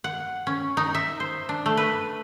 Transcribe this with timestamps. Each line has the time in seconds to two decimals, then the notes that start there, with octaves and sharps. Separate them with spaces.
0.04 F#5
0.47 C#4
0.77 D#4
0.95 E5
1.20 C5
1.49 D4
1.66 A3
1.77 B4